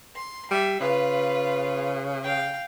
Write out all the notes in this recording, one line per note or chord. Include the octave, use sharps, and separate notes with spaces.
C6
G3 E5
C#3 F4 B4
F5 G5